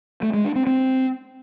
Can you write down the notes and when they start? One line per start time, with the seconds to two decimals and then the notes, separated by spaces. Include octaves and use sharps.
0.22 A3
0.33 G#3
0.45 D4
0.56 C4
0.67 C4